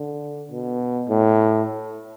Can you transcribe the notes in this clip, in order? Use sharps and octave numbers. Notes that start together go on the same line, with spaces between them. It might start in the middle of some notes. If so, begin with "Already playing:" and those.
Already playing: D3
B2
A2